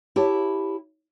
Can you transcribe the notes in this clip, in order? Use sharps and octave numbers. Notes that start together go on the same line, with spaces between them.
E4 G4 C#5 A5